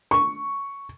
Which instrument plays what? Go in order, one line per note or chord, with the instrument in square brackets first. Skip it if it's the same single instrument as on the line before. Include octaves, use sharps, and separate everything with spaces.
[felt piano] C#6